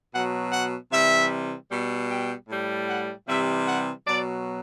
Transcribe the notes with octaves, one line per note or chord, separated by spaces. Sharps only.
B2 F#3 F#5
F#5
C3 E3 G3 E5
B2 G3
G5
A2 G3
F#5
C3 E3 G3 E5
F#5
B2 F#3 D5